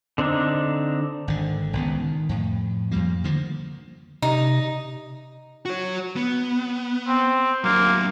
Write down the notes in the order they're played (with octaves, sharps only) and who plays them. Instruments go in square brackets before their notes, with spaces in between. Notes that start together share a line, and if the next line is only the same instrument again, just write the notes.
[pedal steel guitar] D3 C4 D4 D#4
[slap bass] G#1 D3
G#1 C#2 B3
D#3
F2 A2
F2 F3 G3 A#3
D3 D#3 F3 A#3
[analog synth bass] C3 [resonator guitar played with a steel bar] D#4
[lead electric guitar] F#4 C#5
B3
[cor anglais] C4
[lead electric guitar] F#3 D4 [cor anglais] A#3